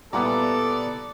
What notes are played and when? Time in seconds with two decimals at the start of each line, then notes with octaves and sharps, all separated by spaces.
0.13 A#2 G3 B3 E4 A4 D5 F#5 A#5